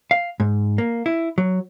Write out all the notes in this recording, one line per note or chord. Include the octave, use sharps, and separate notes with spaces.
F5
G#2
A#3
E4
F#3